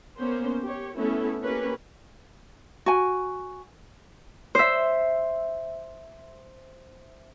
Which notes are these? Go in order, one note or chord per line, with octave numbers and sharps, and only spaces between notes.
A#3 B3 C#4 C5
G4 C#5
A3 B3 C#4 E4 A4
A#3 C#4 G4 A#4 B4
F#4 G#5
C5 E5